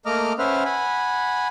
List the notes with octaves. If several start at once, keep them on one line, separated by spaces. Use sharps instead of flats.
A3 A#3 D#5 A#5 D6 F6
C#4 B4 C5 E5 F#5 F6
F#5 G#5 B5